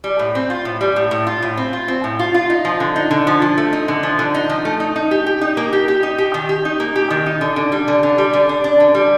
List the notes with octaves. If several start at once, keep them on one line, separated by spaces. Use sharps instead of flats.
G3
A2
C4
F4
A2
G3
A2
A2
F4
A2
C4
F4
C4
A2
F4
F4
D#4
F3
D3
D#4
D3
F3
F3
A3
D#4
D3
F3
D3
D#4
F3
A3
D#4
D#4
G4
G4
D#4
A#3
G4
G4
D#4
G4
D#3
G4
D#4
A#3
G4
D#3
D#4
D3
D3
G3
D3
D3
G3
D3
D4
D4
D3
G3